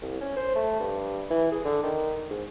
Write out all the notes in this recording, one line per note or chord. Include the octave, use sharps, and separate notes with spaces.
C2
C#4
C5
A3
G2
E3
G#4
D3
D#3
G#2